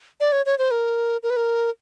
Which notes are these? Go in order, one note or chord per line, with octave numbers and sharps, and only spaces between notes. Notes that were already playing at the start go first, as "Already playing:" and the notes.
D5
C#5
C#5
C5
A#4
A#4
B4
A#4